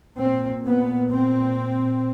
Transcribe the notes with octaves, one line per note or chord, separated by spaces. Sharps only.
A#2 C4
B3
C4